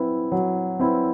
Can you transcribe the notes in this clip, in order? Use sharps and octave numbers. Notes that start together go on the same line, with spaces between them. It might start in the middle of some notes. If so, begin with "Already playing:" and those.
Already playing: F#3 C4 E4 B4
F#3
C4 E4 B4